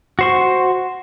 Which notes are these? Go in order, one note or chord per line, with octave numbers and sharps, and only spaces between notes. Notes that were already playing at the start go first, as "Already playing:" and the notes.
F#4 C5 C#6